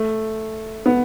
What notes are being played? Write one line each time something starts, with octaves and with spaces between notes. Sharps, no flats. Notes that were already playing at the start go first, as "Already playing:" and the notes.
Already playing: A3
B3